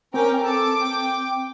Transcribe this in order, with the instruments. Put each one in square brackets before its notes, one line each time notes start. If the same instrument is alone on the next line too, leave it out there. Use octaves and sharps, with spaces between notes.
[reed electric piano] C4 [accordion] C#4 G5 D6 [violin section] A#4
[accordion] A4 A5 [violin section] D6
[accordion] G5